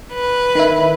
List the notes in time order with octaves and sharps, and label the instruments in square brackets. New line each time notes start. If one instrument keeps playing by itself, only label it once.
[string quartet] B4
[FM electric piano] D#3 E4